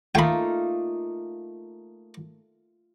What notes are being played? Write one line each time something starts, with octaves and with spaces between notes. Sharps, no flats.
A3 A#3 D#4 F4 G5 B5